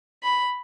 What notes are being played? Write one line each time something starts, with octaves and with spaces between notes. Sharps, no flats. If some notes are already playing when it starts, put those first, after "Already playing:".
B5